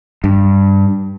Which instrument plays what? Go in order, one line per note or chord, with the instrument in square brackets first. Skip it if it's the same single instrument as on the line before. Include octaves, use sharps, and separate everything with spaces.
[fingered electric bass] G2